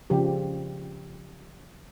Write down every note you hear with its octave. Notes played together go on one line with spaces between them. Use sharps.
C#3 F3 G4